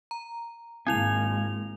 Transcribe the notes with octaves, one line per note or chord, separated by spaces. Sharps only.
A#5
G#1 G#3 A#3 C4 E4 G#5 F7